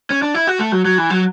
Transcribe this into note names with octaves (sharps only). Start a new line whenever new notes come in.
C#4
D4
E4
F#4
A3
F#3
F#3
E3
F#3